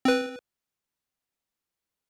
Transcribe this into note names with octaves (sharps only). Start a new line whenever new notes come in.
C4 B4